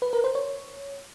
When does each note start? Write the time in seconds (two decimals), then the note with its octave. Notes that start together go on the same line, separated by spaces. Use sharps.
0.02 B4
0.13 A#4
0.24 C5
0.35 C#5